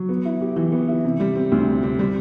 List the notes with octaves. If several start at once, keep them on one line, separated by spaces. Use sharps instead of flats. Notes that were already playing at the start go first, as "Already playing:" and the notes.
Already playing: F#3
B3
E4
G4
E3
B3
E4
C3
G3
C4
D2
C3
G3
G3